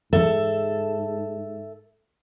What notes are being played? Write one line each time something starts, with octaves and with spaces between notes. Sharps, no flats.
G#2 A4 E5